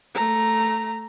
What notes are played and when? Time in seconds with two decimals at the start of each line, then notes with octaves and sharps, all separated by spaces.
0.15 A3 A#5